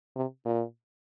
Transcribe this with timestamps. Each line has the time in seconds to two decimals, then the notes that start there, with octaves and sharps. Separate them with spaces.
0.16 C3
0.45 A#2